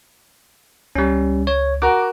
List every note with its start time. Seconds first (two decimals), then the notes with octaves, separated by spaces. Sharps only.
0.95 C#2 G3 C#4
1.47 C#5
1.82 F#4 A#4 D6